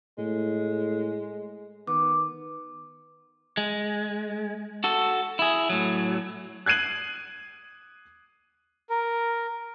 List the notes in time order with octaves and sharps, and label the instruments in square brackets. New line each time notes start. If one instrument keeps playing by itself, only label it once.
[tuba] A2 [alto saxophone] G#3
[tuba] D#3 [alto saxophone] B3 [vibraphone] D6
[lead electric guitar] G#3
F#4 A4
E4 G#4
A2 F#3
[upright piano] F#6 G#6 C7 D#7 F#7
[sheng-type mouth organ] A#4